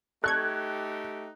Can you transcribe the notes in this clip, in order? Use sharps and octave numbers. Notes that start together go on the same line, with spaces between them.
A3 D#4 G4 A4 C#6 F#6 G#6